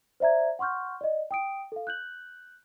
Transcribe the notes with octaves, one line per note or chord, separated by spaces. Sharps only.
C5 D5 E5 A#5 G#6
F#5 C6 C#6 F6 G6
D5 D#5
G5 D#6 D7
A4 F5
F#6 G6 F#7